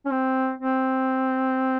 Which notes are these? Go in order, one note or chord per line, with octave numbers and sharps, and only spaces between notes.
C#4
C4
C4